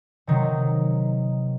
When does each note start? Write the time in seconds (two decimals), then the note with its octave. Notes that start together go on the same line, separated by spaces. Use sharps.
0.27 C3 D#3 F#3